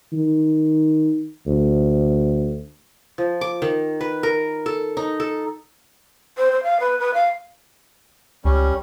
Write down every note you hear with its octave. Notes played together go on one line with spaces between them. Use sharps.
D#3
D2
F3
D6
D#3
B4
A#4
A4
D#4
A4
C5
C5
F5
B4
B4
F5
C#2 G3 C#4